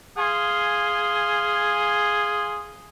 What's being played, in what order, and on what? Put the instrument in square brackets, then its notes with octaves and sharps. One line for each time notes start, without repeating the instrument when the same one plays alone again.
[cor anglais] G#4 [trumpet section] F5 G#5 C6